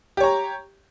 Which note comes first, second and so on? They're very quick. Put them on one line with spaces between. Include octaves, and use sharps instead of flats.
G4 C#5 A#5